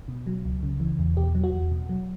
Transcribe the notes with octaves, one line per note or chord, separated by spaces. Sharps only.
B2
F#3
C#2
C#3
E3
E2
B2 G4
F#3
F#4
E2
B2
F#3